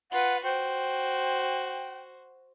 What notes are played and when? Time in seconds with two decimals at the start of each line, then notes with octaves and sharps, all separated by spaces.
0.12 F4 B4 F#5
0.44 F#4 C5 G5